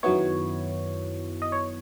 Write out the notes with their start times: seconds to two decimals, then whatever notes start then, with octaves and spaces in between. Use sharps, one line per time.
0.03 F#2 D#3 F#3 B3 E4 C#5
1.42 D#5
1.52 C#5